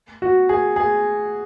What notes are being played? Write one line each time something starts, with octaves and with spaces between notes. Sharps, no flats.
F#4
G#4
G#4